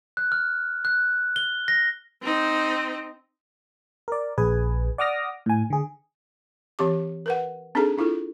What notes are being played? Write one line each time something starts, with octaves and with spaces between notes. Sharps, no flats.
F#6
F6
F#6
G7
A#6
C4 D#4
A#4 D5
A#1 G#4 B4 G#5
D5 F#5 D6 D#6 F6 A#6
A2 G#5
D3 G#4
E3 C4 G4 D6
A#4 B4 F#5
C4 D4 D#4 G#4 A4 A#5
D4 E4 F4 A4